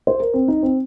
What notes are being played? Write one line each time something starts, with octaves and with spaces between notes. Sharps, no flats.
C5
A#4
C4
D#4
C4